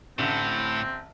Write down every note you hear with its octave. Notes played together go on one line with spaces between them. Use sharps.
A1 A2 D3 C4